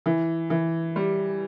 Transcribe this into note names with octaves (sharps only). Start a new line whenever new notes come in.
E3
E3
G3